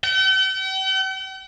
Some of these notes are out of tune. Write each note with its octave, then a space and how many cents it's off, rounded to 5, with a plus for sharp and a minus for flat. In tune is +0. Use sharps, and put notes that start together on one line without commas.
G5 -45